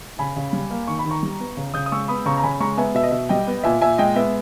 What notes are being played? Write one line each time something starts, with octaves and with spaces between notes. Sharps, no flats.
C#3 G#5 B5
C#3
G3
A#3
D#3 C#6
B5
D#3
A#5 C#6
G3
B3
C#3
C#3 D#6 G6
D#6
G#3 C#6 E6
B3 B5 D#6
C#3 A#5 C#6
A#5
C#3 G#5 B5
G#3 A#5 C#6
B3 E5 G#5
B2 E5
D#5
B2 E5
G3 D#5 G5
B3
A#2 E5 G#5
A#2 E5 G#5
G#3 D#5 G5
B3 E5